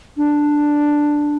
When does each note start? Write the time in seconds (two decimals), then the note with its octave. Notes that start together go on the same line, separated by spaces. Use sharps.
0.17 D4